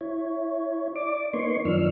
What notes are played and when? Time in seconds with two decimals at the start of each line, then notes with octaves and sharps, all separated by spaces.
0.01 E4 C#5
0.96 D5 D6
1.33 A#3 B3 D#4 C#5 C6 C#6
1.65 F#2 D#3 F3 D4 E6 F6